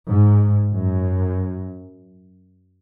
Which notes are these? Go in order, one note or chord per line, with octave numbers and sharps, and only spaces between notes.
G#2
F#2